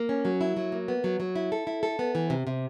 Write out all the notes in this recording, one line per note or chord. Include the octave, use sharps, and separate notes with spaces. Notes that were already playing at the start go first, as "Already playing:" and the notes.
Already playing: A#3
C#4
F#3
E4
F#3
A#3
B3
F#3
F#3
E4
A4
E4
A4
B3
E3
C3
C3